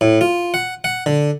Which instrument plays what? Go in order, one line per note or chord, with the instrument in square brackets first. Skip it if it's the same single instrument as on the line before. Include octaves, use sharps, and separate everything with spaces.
[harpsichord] A2
F4
F#5
F#5
D3